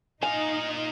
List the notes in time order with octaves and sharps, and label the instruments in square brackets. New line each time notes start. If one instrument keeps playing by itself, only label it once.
[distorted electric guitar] A#2 F5 [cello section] D#4 [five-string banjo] G#5